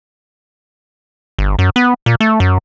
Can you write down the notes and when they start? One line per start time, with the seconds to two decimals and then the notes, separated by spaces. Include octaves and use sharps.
1.39 G1
1.59 F#2
1.76 B3
2.06 A#2
2.20 A3
2.40 F#2